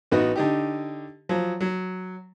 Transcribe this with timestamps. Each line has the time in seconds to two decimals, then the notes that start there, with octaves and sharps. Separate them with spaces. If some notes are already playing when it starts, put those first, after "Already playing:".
0.12 A1 B3 D#4 F#4
0.36 D3 D#4 G4
1.29 F3 F#3
1.61 F#3